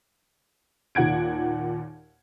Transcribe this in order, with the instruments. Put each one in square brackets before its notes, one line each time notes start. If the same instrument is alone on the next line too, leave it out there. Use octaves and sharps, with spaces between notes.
[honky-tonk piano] D#2 A#2 F#5 G#6 D7